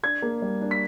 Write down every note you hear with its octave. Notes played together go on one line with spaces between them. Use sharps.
D4 G#6
A#3
G3
D4
B6